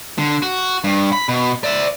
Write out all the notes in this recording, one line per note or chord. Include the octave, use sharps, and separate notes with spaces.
D3
F#4
G2
B5
B2
D5 E5